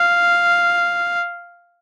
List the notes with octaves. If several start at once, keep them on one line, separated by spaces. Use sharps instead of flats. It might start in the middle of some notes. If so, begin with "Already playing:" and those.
Already playing: F5